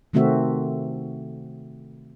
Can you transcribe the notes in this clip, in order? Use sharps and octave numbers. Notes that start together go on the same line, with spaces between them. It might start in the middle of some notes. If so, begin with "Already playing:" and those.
C3 D#3 A3 C4 F#4 E5